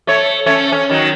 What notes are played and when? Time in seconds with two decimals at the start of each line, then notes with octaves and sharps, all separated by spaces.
0.07 A3 C#5
0.46 A3 C#4 C#5
0.72 C#4
0.90 D#3 F#3